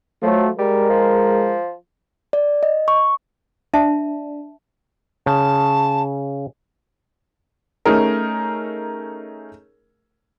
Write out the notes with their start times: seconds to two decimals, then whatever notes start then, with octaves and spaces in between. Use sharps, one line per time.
0.23 F3 F#3 A3
0.59 G3 G#3 A#4
0.90 F3
2.33 D5
2.63 D#5
2.88 C#6
3.74 D4 E5 A5
5.26 C#3 A5
7.85 A3 C#4 D#4 G#4 A#4